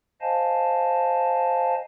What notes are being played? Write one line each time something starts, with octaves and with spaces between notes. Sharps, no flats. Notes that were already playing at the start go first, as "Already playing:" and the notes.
C5 D#5 F5 G#5 A5